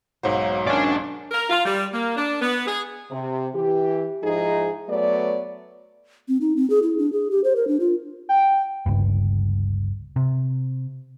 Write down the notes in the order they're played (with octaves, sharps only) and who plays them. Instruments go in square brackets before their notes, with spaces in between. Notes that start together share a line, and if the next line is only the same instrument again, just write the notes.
[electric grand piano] B1 G#2 C5 [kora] F#3 A#3
[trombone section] D#3 C#4 [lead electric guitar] D4 D5
[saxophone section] A#4
F4
G3
A#3
D4
B3
G#4
[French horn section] C3
E3 G4
G#2 F3 D#4 E4 G#4
F#3 A3 B3 C#5 D5
[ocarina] C4
D#4
C4
G#4
E4
D4
G#4
G4
C5
A#4
D4
F4
[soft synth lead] G5
[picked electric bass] G1 C#2 G2
C3